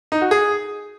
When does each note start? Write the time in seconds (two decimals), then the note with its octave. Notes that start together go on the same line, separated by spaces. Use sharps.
0.12 D#4
0.21 F#4
0.31 G#4